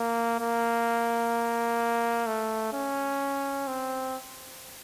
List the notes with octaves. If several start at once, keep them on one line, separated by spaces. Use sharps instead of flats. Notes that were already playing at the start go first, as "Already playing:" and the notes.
Already playing: A#3
A#3
A3
C#4
C4